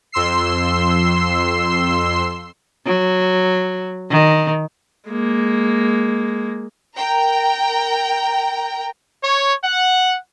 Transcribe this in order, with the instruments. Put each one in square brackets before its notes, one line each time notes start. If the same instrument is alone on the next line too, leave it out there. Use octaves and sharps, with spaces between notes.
[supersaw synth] F2 C6 E6 C7
[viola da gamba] F#3
D#3
[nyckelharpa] G#3 A#3
[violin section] A#4 G5 A#5
[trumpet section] C#5
F#5